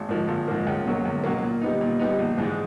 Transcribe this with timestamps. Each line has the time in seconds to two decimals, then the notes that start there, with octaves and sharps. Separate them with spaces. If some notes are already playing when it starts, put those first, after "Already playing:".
Already playing: G#1
0.09 G#2 F3 A#3
0.28 G#1
0.48 G#2 F3 A#3
0.67 C#2
0.86 B2 F#3 A#3
1.05 C#2
1.24 B2 F#3 A#3
1.43 A#2
1.61 G3 B3 D#4
1.81 A#2
1.99 G3 B3 D#4
2.19 A#1
2.38 G#2 E3 G#3